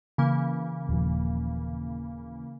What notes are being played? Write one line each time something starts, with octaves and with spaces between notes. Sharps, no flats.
C#3 E3 A#3
D#1 F3